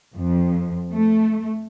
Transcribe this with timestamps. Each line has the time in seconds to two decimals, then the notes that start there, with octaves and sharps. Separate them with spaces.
0.14 F2
0.91 A3